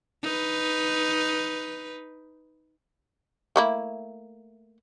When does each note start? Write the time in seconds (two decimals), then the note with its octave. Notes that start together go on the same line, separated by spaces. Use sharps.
0.23 D#4 B4
3.56 A3 A#3 E4